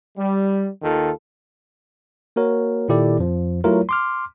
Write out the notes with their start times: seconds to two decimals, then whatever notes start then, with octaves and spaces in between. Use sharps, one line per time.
0.18 G3
0.82 D#2 D#3 F4 A4
2.36 A#3 F#4 A#4 C#5
2.89 A#2 D#3 E4 G4 A4 D5
3.19 F2 F3
3.64 F#3 A3 E4 F4 A#4 C#5
3.89 C6 D6 F6